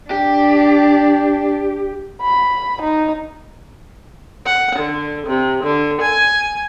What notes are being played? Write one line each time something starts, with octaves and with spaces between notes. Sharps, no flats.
D4 G4
B5
D#4
F#5
D3
C3
D3
G#5